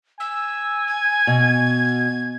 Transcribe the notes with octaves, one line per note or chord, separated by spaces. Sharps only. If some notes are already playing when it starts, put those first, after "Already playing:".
G#5 E6
G#6
B2